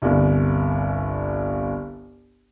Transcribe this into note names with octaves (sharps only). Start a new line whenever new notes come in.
G1 C2